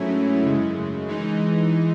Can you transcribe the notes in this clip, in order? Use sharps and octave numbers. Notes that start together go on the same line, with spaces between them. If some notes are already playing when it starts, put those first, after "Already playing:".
Already playing: G#2 F#3 A3 C#4 E4
F#2 C#3 G#3
E3 G#3 D#4